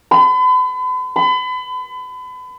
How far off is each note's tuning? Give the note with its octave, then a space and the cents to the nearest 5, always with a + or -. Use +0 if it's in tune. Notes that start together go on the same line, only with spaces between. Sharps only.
B5 +40
B5 +35